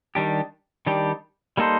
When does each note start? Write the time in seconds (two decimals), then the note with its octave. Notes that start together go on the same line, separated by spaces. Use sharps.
0.15 D#3 G3 D4 G4
0.86 D#3 G3 D4 G4
1.57 G3 A#3 D#4 A4 C5